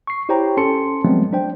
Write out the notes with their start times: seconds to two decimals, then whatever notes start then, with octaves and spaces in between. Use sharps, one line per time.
0.07 C#6 C7
0.29 E4 G4 C5 C#5 G5 A#5
0.57 C#4 A4 A5 C6 C#7
1.05 F3 F#3 G#3 A3 B3 C4
1.33 D4 C5 G5